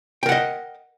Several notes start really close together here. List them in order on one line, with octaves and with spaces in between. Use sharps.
G5 A#4 F#5 D#5